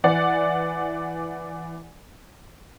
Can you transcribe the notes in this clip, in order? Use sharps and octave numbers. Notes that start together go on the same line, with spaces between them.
E3 D5 F#5